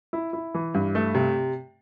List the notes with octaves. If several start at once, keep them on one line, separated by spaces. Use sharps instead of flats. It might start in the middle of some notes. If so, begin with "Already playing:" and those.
E4
E4
E3
G2
A3
C3